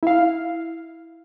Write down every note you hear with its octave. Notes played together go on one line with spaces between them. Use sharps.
E4 F5